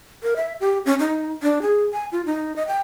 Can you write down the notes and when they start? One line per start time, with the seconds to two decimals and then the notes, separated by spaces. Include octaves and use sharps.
0.23 A#4
0.36 E5
0.60 G4
0.86 C#4
0.99 D#4
1.42 D4
1.62 G#4
1.93 G#5
2.12 F4
2.25 D#4
2.56 D#5
2.68 G5